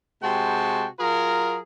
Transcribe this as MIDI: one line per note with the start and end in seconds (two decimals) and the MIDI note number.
0.23 0.87 48
0.23 0.87 56
0.23 0.87 66
0.23 0.87 79
0.23 0.87 81
0.99 1.59 54
0.99 1.59 65
0.99 1.59 68
0.99 1.59 70